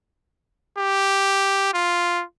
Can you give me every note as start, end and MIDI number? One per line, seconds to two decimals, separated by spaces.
0.78 1.71 67
1.73 2.24 65